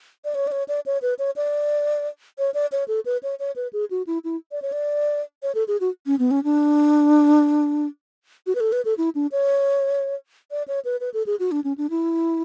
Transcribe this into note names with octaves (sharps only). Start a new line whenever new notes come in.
D5
C#5
D5
C#5
D5
C#5
B4
C#5
D5
C#5
D5
C#5
A4
B4
C#5
C#5
B4
G#4
F#4
E4
E4
D5
C#5
D5
C#5
A4
G#4
F#4
C#4
B3
C#4
D4
F#4
B4
A4
B4
A4
E4
D4
C#5
D5
C#5
B4
B4
A4
G#4
F#4
D4
C#4
D4
E4